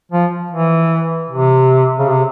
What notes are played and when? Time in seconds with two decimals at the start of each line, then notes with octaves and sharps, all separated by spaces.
0.12 F3
0.51 E3
1.30 C3
1.99 C#3
2.09 C3